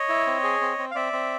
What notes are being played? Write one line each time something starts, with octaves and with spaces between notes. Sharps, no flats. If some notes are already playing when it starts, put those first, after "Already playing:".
Already playing: C#5 D#5
E4
C4
G#4
C4
C4
F5
C4 D5 E5
C4